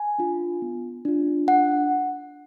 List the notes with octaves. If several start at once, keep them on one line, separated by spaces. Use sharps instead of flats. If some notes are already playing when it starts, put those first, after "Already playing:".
Already playing: G#5
D4 F4
B3
D4 F4
D4 F#5